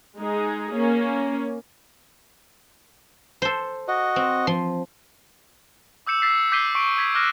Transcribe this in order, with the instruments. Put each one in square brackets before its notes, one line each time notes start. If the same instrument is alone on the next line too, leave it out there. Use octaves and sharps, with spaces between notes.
[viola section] G#3 D#4 G#4
A#3 C#4
[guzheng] A4 C5
[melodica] F#4 D#5
[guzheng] C4
F3 C6
[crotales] D6 E6 G6 C#7 E7
E6 A6 B6 C7
D6 G6 B6 C7 D#7 G7
C#6 B6 D7
D#6 G#6 B6
D6 F6 F#6 A#6 E7